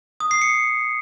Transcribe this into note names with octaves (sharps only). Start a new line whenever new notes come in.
D#6
C7
C#7